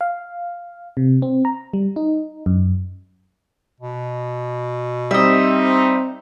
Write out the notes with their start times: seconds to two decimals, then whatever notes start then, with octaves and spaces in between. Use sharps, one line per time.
0.01 F5
0.97 C3
1.22 C4
1.45 A#5
1.73 G3
1.96 D#4
2.46 F#2
3.80 B2
5.11 G3 C4 D#4 D#5 E5